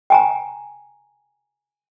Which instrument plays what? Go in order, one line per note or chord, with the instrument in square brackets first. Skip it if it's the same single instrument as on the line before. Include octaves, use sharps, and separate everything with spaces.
[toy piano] G5 G#5 A#5